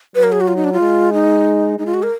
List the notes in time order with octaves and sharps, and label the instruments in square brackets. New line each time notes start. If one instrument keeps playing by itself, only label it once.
[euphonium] F#3 [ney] B4
[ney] A#4
G#4
F#4
F4
D#4
D4
F4
[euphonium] G#3
[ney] D#4
[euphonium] G#3 [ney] D#4
[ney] F4
F#4
A#4